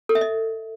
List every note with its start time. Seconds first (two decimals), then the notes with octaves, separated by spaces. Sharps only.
0.09 A4
0.15 E5
0.21 D#5